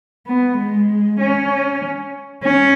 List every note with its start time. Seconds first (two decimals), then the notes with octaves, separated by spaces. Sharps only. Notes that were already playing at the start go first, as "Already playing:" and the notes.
0.27 B3
0.58 G#3
1.20 C#4
2.44 C#4